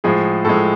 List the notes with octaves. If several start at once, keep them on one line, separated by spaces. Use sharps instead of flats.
A2 F3 G#3 G#4
A2 F3 G#3 A4